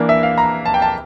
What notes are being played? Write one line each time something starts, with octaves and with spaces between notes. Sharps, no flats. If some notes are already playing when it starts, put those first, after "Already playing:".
Already playing: E3 A#3 D4
E5
F5
A#5
A5
G5
A5